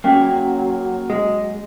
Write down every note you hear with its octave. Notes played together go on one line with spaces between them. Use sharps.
F#3 A#3 C#4 G#4 F5 G5
G#3